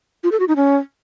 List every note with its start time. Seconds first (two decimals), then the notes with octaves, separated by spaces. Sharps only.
0.23 F4
0.32 A4
0.40 F#4
0.48 D#4
0.56 C#4